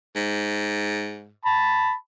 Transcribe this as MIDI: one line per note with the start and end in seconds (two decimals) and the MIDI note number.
0.16 1.32 44
1.45 1.93 81
1.45 1.93 83